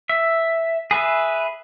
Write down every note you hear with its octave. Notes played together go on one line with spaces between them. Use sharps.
E5
G#4 B4 E5